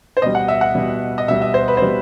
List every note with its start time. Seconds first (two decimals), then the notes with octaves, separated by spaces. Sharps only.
0.17 C5
0.22 B2 G3 D#5
0.35 F#5
0.48 E5
0.61 F#5
0.75 B2 G3
1.18 D#5
1.28 B2 G3 E5
1.42 E5
1.54 C5
1.68 B4
1.77 B2 G3 C5